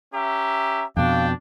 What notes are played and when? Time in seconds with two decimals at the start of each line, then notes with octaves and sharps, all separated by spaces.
0.14 C#4 G4 E5 A#5
0.97 F2 B2 D4 F5 G5